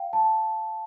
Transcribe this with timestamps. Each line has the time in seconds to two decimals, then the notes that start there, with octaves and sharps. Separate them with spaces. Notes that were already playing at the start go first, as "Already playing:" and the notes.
Already playing: F5 G5
0.13 A5